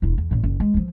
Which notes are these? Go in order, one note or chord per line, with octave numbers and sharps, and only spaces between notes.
E1 E4
E2
A1 A#2
F#1
G#3
E3 F3